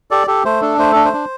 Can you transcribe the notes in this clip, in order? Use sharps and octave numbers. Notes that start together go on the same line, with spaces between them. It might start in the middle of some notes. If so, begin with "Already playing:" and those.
G4 A4 D5
G4 A4
A3 C5
D4 A4
A3 C5
D4 A4
C5
D4